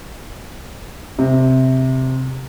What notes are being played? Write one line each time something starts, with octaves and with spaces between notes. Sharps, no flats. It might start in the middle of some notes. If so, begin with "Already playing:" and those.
C3